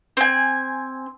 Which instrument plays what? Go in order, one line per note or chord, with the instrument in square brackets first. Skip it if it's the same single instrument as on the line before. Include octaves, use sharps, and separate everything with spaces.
[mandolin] C4 G#5